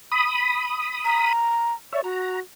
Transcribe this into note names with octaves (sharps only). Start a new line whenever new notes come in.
B5 D#6
A#5
C#5 D5 E5
F#4 A#5